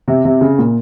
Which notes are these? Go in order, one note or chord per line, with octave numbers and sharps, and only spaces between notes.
C3
C3
C#3
A#2